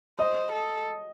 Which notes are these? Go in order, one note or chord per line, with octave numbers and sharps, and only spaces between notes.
C5 D#5 D#6
A4